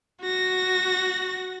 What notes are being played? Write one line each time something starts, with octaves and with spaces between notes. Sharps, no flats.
F#4 A#6